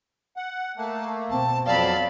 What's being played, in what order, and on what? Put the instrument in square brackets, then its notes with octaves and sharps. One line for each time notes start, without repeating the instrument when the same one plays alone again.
[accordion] F#5
[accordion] A3 A#3 [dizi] A5
[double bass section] B2 C4 [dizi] A5
[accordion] F2 F#3 A5 [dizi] D5 [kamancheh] F5 B5